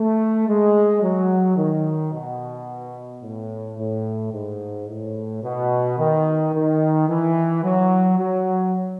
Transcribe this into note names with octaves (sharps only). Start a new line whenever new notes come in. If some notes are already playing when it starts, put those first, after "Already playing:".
Already playing: A3
G#3
F#3
D#3
B2
A2
A2
G#2
A2
B2
D#3
D#3
E3
F#3
F#3